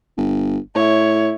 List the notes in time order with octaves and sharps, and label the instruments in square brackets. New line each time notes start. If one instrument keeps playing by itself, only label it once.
[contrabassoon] G1
[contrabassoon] A2 [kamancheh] E4 C#5